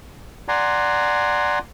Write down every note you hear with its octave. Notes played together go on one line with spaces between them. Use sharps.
D5 F#5 G#5 A#5 C6